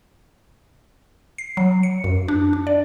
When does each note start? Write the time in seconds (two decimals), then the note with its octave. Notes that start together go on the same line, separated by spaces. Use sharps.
1.38 C7
1.57 F#3
1.83 C#7
2.04 F#2
2.28 D4
2.53 D4
2.67 D5